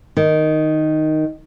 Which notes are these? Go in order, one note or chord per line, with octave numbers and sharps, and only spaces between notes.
D#3